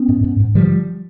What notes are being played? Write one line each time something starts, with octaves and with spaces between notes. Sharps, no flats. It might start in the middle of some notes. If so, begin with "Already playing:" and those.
Already playing: B3 C#4
G#2
G#2
G#2
D3 F3 G3